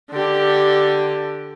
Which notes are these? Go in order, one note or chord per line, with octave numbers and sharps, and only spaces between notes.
D3 G4